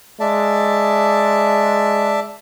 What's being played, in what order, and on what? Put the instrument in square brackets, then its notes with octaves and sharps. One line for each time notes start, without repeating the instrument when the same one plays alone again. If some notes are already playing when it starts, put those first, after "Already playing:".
[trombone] G#3 [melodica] D5 E5 A5